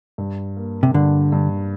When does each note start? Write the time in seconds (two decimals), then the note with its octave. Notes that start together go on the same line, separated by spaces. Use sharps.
0.18 G2
0.57 A#3
0.83 C3
0.94 G2 D3
1.32 G2